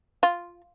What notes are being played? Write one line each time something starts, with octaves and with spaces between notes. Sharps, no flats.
F4